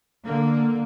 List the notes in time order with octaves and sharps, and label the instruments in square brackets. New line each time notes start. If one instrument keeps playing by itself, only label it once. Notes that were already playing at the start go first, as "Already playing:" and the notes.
[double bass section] D3 A#3